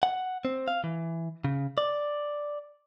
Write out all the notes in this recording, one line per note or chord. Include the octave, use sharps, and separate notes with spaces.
F#5
C4
F5
E3
C#3
D5